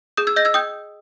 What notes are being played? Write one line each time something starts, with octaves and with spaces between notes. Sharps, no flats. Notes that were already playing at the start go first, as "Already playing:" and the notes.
G#4 D#6 G6
E6 G#6
D#5 G6 A#6
E6 G#6
G5 D#6 G6